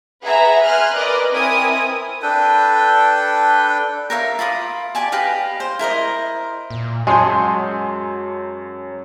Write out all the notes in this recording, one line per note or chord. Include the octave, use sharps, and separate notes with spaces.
G#4 B4 E5 F#5 A#5
G#5 C6 F6 F#6
A#4 B4 D5 D#5
C4 E4 A#4 G#5 D#6
D4 A4 B4 G5
A#4 C#5 E5 F5
F4 B5 D6 D#6
G4 D5 G#5 A5
G4 B4 D#5 F5
C5
E4 A#4 C5 D#5
A#2
F#2 F#3 G#3 C#5 G#5 A5 C6 G6